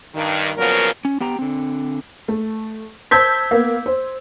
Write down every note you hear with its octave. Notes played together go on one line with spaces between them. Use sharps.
G2 D#3
A#2 C#3 F3 F#3 B3 A#4
C#4
B3 G4 G5 A#5
D3 C4
A3
C5 A5 E6 G6 G#6 B6
A#3 B3
C5